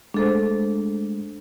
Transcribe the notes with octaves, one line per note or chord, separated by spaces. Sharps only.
G#3 A3 D4 A4 C5